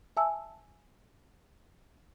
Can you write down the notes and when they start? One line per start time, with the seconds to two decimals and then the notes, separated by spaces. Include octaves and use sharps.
0.17 E5 G#5 A5 E6